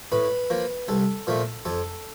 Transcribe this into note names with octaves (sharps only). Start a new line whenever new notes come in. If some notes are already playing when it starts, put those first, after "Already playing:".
A2 B4
F3 A#3
C2 A4
A#2 F3 A3
F2 A4